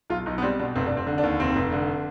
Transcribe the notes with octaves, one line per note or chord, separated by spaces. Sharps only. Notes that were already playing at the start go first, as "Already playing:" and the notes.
B1 F4
B1 D#4
B3
G3 C4
B2 D4
F1 C4
F1 D4
C4
D3
D4
D#2
F1 C4
F1
D3